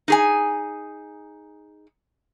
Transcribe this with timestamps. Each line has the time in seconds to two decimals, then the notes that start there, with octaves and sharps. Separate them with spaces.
0.08 D#4 G#4 G#5